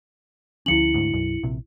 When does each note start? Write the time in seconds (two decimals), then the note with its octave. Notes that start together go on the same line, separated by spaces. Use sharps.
0.66 D2 F3 C#4 E4 C#7 F#7
0.94 D2 G#2
1.13 B1 F#2
1.43 A#1 C3